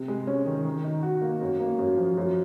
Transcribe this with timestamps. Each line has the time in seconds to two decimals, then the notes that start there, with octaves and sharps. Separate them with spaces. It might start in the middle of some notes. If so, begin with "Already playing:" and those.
Already playing: C3
0.08 G#3
0.27 C#4
0.46 D#3
0.65 D#3
0.84 D#4
1.03 F#4
1.22 A#3
1.41 F#2
1.60 A#3
1.79 F#2
1.97 F3
2.17 F#2